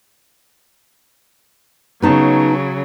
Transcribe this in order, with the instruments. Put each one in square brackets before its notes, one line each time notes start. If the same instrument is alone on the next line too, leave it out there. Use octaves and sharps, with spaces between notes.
[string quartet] C#3 F#3 [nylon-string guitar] B3 D#4 A5